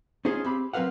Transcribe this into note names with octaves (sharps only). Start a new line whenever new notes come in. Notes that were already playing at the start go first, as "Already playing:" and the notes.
C#4 D#4 F4 G#4 C5
C4 G4 B5
F#3 C4 A#4 B4 F5 F#5